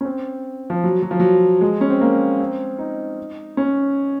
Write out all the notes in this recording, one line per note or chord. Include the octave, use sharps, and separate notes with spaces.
C#4
C4
F3
F#3
F#3
F3
F#3
G#3
C#4
C4
A#3
C4
D#4
C#4